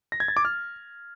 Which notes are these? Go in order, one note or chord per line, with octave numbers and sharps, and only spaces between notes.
A#6
G#6
A6
D6
F6